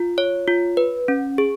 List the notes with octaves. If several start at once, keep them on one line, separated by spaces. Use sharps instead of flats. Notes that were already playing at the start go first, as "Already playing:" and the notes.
Already playing: F4
C#5
F4
B4
C#4
G#4